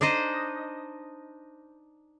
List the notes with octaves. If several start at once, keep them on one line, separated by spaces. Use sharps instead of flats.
D4 D#4 C5 D#5